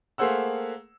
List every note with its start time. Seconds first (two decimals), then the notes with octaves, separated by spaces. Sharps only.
0.18 A3 A#3 G#4 C5 F#5 E6